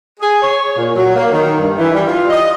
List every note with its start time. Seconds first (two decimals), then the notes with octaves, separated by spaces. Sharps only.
0.20 G#4
0.42 C#5
0.76 A#2
0.96 F#3
1.15 A#3
1.32 D#3
1.60 G2
1.78 E3
1.94 G3
2.07 F4
2.30 D#5